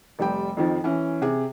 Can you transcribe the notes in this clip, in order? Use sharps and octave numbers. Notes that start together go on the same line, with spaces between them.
F1 G3 G5
F2 D#3 F3
E3 C#4
C3 G#4